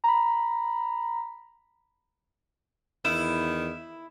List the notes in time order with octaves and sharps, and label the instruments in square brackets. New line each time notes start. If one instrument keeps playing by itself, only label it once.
[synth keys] A#5 B5
[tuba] E2 [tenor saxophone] D#3 [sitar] E4 [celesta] E7